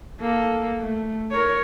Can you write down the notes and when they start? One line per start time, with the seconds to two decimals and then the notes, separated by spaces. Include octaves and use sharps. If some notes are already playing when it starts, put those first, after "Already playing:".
0.20 A#3 A4
0.79 A3
1.32 A#4 C#5